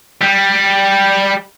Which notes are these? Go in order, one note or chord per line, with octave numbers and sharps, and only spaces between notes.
G3